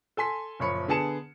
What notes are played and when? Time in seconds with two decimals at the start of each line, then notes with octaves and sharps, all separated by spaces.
0.17 A4 G#5 C6 B6
0.59 F#1 A#2 F3 C#5 B5 C#7
0.88 D3 B3 G#4 A5 C#7 E7